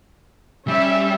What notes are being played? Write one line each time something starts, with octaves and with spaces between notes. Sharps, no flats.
G3 C#4 E5